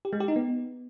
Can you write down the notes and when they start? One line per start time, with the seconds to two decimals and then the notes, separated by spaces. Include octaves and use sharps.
0.05 G4
0.13 G#3
0.20 G4
0.28 D#4
0.36 B3